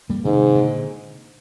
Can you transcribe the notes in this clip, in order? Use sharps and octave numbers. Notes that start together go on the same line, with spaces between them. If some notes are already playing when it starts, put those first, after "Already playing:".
G3 A#3
G#2 C3 D#3
A#2 D3